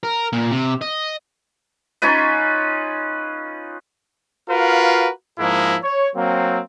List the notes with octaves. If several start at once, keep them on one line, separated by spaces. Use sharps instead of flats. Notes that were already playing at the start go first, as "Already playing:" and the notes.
A#4
A#2
C3
D#5
C#4 D#4 F4 B4
F4 F#4 A#4 B4 F5
G#2 F3 G#3 A#3 E4
C#5
F#3 A#3 C4